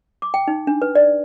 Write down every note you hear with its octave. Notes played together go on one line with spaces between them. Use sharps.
D6
G5
D#4
D4
B4
D5